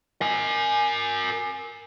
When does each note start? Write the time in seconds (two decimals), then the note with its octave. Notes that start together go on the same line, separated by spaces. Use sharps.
0.21 A#4 G#5